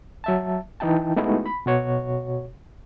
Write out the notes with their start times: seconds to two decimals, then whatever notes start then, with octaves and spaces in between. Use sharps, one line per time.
0.24 F#3 E5 A5
0.80 E3 D#4 E4 G5 A5
1.16 G#3 A3 B3 D#4 E4 F#4
1.46 B5
1.66 B2 F#4 C#5